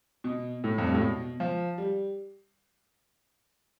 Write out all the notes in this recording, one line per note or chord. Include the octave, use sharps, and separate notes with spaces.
B2
A2
F2
G2
A2
B2
F3
G3